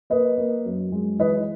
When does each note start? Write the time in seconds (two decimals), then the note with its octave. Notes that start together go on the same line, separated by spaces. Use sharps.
0.10 A#3 B4 D#5
0.38 A#3
0.66 F#2
0.92 G#3
1.19 E3 B4 D#5